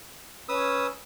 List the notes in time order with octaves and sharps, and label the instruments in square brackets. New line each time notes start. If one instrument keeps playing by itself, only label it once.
[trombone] C#4 [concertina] B4 D#6 E6